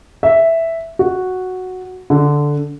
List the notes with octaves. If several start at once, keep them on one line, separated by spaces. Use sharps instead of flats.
E5
F#4
D3